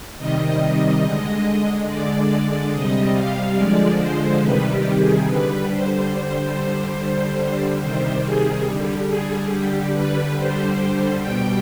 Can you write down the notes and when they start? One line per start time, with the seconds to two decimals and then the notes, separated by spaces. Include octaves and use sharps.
0.18 C3 D#3 G3 D#5
1.04 D3 G#3
1.88 D3 G#3 D5
2.72 C3 G3 D#5
3.15 F5
3.57 D3 F3 G#3 D5
3.99 C5
4.42 C3 D#3 G3 B4
4.70 G4
4.98 G#4
5.26 D3 G3 B4
5.69 C5
6.11 D3 G3
6.96 D3 G3
7.81 C3 D#3 G3 C5
8.24 G#4
8.66 D3 G3
9.08 G#4
9.50 D3 G3 G4
9.93 B4
10.34 D3 G3 C5
11.20 B2 G3 G5